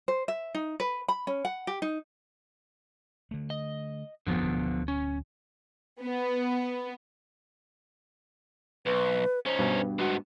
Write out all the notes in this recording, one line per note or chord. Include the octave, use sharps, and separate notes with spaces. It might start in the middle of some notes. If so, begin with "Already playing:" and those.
C5
E5
D#4
B4
B5
C#4
F#5
G4
D#4
D3 A3
D#5
G#1 F2 D3 F3 B3
D1 B2
C#4
B3
B1 B4
C#4 D#4 C5
G2 B2
G#2 B3 F#4